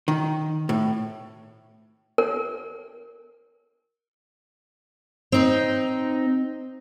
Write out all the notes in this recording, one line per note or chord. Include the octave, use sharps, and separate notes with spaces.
D#3
A2
A#4
C4 D#4